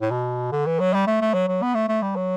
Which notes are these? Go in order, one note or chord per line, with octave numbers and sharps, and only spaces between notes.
A2
B2
D3
E3
F#3
G3
A3
A3
F#3
F#3
B3
A3
A3
G3
F#3